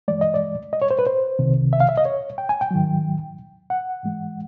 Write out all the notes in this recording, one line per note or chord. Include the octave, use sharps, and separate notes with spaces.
G2 E3 G#3 D5
D#5
D5
D#5
C#5
C5
B4
C5
C2 C3 D#3
E5
F5
E5
D#5
C#5
G5
G#5
G5
G#2 D#3 F#3
F#5
G#2 E3 G#3